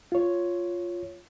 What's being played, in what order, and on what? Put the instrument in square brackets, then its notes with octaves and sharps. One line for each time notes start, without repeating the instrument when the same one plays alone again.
[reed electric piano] F4 C#5